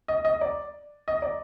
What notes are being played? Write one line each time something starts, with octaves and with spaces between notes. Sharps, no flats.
D#5
D#5
D5
D#5
D5